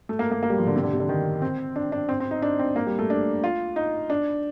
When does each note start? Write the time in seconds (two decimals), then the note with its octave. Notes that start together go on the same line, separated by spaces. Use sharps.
0.09 A3
0.19 A#3
0.31 A#3
0.43 A#3
0.50 G3
0.58 F3
0.67 D3
0.76 C3
0.83 D3
0.93 C3
1.00 D3
1.09 D#3
1.42 C4
1.76 D4
1.92 D4
2.09 C4
2.20 C4
2.31 D#4
2.42 D4
2.59 C4
2.76 A#3
2.87 G3
2.99 A3
3.10 D4
3.44 F4
3.76 D#4
4.10 D4